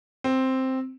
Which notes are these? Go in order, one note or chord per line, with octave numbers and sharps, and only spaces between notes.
C4